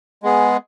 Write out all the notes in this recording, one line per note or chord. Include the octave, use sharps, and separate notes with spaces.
G#3 B3 G#4